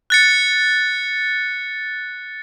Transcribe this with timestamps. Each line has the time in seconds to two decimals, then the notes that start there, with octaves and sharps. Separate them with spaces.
0.10 F#6 A6 C#7